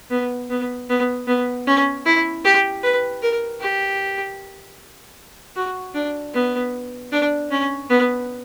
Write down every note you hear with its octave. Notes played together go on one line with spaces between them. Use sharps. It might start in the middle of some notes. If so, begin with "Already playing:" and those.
B3
B3
B3
B3
C#4
E4
G4
B4
A#4
G4
F#4
D4
B3
D4
C#4
B3